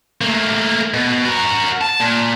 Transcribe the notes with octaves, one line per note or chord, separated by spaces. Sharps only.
A3 A#3
B2
F#4 A#4
A5
A#2